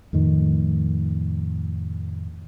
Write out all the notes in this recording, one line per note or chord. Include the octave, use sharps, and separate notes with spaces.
F2 A2 D#3